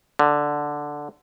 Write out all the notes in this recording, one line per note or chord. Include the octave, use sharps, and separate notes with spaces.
D3